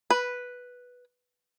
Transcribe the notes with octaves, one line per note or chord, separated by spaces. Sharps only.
B4